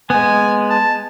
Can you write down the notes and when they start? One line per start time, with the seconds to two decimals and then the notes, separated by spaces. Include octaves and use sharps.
0.10 G#3 B3 G#5
0.70 A5